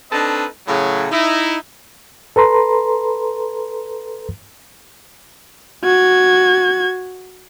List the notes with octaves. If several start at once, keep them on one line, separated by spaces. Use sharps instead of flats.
C4 D4 D#4 A4 B4 D#5
A2 C#3 F#3
D#4 E4
A4 B4 A#5 C6
F#4 G#6